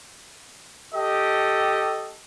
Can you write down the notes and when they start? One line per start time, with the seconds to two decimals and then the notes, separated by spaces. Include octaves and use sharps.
0.95 G4 A4 D#5